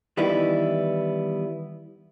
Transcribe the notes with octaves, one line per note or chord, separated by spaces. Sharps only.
D#3 E3 G3 B3 E4